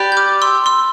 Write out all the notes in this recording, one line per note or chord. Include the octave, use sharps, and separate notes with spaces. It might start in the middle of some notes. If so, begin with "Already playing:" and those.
Already playing: G4 B4 D5
G6
D6 F6
C6 E6
C6 E6